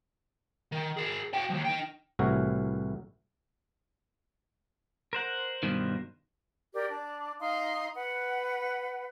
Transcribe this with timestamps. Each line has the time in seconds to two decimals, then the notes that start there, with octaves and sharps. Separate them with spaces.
0.72 D#3
0.97 G#4 A#4
1.34 F#4 G5
1.50 D#2 F3
1.65 D#4 G5
2.19 C2 A2 E3 F#4 A#4
5.13 A#4 C5 F#5
5.63 G2 B2 D#3
6.74 G4 A#4 D5
6.90 D4
7.39 D#4 F5 C6
7.94 B4 F#5